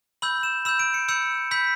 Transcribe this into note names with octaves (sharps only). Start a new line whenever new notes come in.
B5 E6 G6 F#7
E7
B5 E6 G6 E7
D7
C#7
B5 E6 G6 C#7
B5 E6 G6 B6